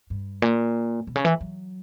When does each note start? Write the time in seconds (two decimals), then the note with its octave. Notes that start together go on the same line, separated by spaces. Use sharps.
0.10 G2
0.42 A#2
1.07 B2
1.15 C#3
1.25 E3
1.41 F#3